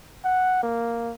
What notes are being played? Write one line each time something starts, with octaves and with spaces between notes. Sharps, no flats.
F#5
A#3